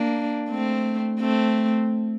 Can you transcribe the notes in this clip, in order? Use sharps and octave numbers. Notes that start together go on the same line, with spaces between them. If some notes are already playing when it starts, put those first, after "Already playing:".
Already playing: A#3 D4
A3 C4
A3 C4